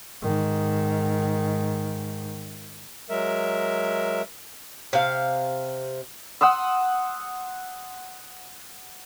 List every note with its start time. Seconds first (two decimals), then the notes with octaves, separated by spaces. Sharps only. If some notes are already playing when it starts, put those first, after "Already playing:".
0.22 G#2 D#3
3.10 F#3 G#3 A#4 E5
4.93 C3 F5
6.41 F#5 C6 D#6 E6